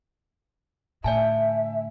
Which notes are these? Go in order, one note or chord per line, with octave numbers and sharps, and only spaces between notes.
A2 D3 D5 E5 G#5 A5